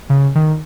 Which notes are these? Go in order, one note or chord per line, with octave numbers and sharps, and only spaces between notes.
C#3
D#3